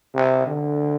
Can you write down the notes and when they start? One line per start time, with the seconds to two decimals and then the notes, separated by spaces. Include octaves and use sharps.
0.14 C3
0.47 D3